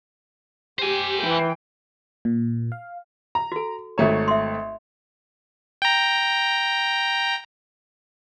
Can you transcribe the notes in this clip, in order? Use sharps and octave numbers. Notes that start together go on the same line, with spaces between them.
G4 C5 G#5
E3 G5
A#2
F5
A#5
F#4 A4
G#1 A3 C#5 A#5
E5 C6
G5 A#5